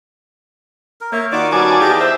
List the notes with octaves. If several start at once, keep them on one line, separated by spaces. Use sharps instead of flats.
A#4
A#3 C#5 E5
D#3 F4 F#4 D5 D6
G3 B3 C#4 F#4 G#5 A5 D6
E2 G4 D5 D#5 F5
C5 E5